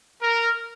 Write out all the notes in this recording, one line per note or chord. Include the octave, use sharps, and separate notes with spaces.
A#4